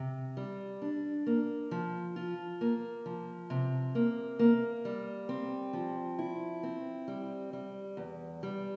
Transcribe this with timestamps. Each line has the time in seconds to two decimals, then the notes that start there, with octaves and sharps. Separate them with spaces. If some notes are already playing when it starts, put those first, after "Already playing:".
Already playing: C3
0.37 G3
0.82 D4
1.26 A#3
1.71 F3
2.16 F4
2.61 A#3
3.06 F3
3.50 C3
3.95 A#3
4.39 A#3
4.85 G3
5.29 C4
5.73 F3
6.19 E4
6.63 C4
7.08 G3
7.53 G3
7.97 E2
8.43 G3